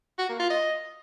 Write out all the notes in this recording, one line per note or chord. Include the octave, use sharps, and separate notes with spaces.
F#4
A#3
F4
D#5